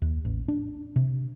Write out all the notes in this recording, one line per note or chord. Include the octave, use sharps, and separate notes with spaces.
D#2
A1
D4
C3